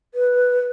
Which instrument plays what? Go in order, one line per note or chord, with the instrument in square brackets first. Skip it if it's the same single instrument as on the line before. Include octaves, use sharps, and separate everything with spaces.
[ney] B4